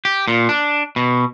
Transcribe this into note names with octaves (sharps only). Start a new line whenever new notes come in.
G4
A#2
D4
B2